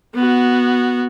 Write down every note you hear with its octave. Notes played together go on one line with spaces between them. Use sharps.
B3 F#4